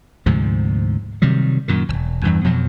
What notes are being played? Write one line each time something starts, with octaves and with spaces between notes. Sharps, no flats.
D2 G#2 C3 F3
C3 D#3 F#3 G3
F#2 A#2 D#3
E1 C#2
E2 G2 E3
F2 B2 F3 F#3